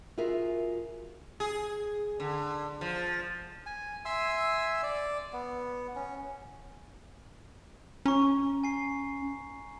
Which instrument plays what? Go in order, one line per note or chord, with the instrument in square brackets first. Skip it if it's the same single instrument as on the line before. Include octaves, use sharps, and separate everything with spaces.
[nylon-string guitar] F4 F#4 G#4 A#4 E5
[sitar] G#4
D3
F3
[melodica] G#5
E5 G#5 C6 E6
D5
B3
C#4
[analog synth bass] C#4 [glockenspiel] A#5 C#6
[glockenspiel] G#5 C7